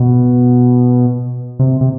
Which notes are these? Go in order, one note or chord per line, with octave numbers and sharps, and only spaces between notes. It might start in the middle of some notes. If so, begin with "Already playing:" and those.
Already playing: B2
C3
C3